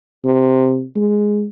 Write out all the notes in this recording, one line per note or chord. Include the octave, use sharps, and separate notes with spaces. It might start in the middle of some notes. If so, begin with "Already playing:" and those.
C3
G#3